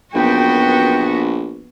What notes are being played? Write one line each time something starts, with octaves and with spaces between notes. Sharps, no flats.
A#1 F#2 B3 F#4 B4 G5